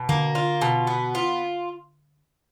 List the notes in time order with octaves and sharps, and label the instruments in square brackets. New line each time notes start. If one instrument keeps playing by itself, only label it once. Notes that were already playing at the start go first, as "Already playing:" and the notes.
Already playing: [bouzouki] B2
[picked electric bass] D3 [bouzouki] A#3
[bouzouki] F4
B2
B3
F4